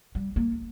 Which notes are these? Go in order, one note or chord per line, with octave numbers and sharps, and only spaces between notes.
G3
A#3